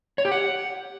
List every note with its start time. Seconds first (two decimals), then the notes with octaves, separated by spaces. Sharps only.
0.18 C#5
0.25 G4
0.32 F#5